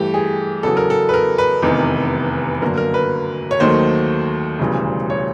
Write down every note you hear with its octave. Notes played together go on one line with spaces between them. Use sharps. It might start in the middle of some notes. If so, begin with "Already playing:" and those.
Already playing: G2 E3 A3 G4
G#4
E2 C#3 F#3 B3 A4
A#4
A4
B4
A#4
B4
F1 E2 C3 D#3
G1 F#2 D3 F#3 A#3 A#4
A#4
B4
C#5
D#2 D#3 F#3 A3 C5
E1 D2 C#3 E3 G3
C#5